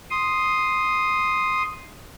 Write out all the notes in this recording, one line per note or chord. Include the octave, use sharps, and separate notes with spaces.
C6 D#6